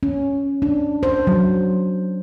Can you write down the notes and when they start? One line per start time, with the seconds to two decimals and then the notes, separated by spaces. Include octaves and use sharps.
0.03 C#4
0.62 D4
1.03 C5
1.27 F#3